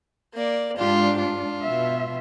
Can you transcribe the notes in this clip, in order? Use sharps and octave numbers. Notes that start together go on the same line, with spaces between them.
A#3 D5
G#2 D4 F4 G4
F4
B2 E5